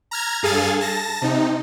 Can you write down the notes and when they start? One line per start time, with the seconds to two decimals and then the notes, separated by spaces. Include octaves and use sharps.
0.11 A#5 F6 G#6
0.43 G2 G#4 A4 F5 G#5 A6
0.81 A5 A#6
1.22 C3 D#4